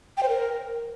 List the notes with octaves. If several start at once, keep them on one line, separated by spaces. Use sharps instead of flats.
G5
C5
A#4